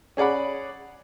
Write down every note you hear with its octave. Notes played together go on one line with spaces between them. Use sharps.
C#4 G#4 D5 F#5 B5